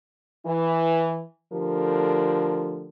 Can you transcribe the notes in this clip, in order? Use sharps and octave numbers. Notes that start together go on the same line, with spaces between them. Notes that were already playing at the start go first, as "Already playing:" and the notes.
E3
D3 F3 A3 G4 A#4